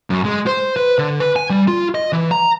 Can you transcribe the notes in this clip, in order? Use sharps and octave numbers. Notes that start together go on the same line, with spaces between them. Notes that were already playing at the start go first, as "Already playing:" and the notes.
F#2
G#3
C5
B4
D3
B4
G#5
G3
F4
D#5
E3
A#5